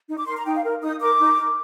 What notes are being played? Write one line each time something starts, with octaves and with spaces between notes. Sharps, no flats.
D#4
D6
A#4 C6
A#5
D#4 G5
F5
A#4
D#4 D#6
A#4 D6
D#4
A#4